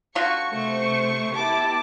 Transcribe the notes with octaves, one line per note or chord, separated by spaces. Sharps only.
D3 F4 F#4 C#6
C3 A3 C5 C#6
B3 E4 G4 A5 D6